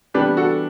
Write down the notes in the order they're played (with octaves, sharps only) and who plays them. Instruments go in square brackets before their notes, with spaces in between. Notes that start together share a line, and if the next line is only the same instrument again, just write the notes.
[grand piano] E3 G3 B3 D4 G4 B4
F#4 A4